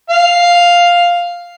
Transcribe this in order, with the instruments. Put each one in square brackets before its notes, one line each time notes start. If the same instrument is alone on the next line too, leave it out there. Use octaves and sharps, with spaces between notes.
[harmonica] F5